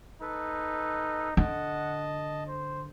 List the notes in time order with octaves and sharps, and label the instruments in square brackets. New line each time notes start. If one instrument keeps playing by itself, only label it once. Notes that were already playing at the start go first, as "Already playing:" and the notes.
[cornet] D#4 [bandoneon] A4 B4
[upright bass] D3 [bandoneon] D#5 A5 [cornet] F#5
[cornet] C5